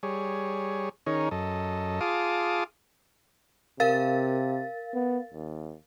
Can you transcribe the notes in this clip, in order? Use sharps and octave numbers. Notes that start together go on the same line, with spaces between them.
G3 G#4 C#5
D#3 C#4 D#4 G#4 A#4 C#5
F#2 A4 D#5
F4 G#4 F5 A5 D6 D#6
C3 A#4 F5 A6
B3
D#2